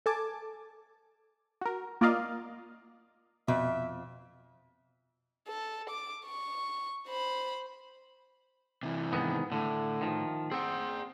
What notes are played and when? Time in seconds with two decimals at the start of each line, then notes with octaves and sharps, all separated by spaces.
0.06 A4 G#5 A5 D6
1.61 F#4 A#4
2.01 A#3 F4 A#4 D5 D#5 F5
3.48 F2 B2 E5
5.48 A4
5.90 D6
6.27 C#6
7.07 C5 B5
8.83 C3 E3
9.13 G#2 D#3 B3
9.52 A2 D3
10.01 D#3 F3
10.52 C4 G#4 F#5